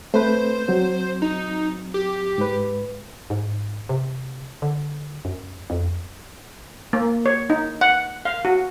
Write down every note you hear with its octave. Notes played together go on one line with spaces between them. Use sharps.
A3 C4 B4 C5
F#3 C4
D#4
G4
G#2 B4
G#2
C3
D3
F#2
F2
A#3
C#5
D#4
F#5
F5
F#4